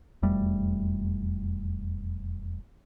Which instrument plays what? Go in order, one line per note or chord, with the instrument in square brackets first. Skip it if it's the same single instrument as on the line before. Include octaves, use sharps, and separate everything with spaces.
[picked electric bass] E1 F2 G3 A3